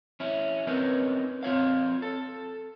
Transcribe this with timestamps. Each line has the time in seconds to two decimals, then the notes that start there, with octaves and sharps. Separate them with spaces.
0.20 C#4 E4
0.67 C4 C#4 D#4 A#4 B4 C#5
1.43 C4 F4 C#5 F5
2.02 A4